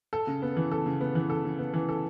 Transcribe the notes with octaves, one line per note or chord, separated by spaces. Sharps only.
A4
C#3
B3
E3
A4
C#3
B3
E3
A4
C#3
B3
E3
A4